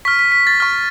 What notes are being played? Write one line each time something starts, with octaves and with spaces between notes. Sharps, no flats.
C#6 F6 B6
B6
B6
A6
C#6 F6